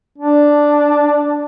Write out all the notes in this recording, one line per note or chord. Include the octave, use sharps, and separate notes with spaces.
D4